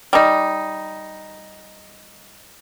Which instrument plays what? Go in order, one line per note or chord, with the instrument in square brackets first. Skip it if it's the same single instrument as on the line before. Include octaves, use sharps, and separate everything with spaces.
[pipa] G3 D#4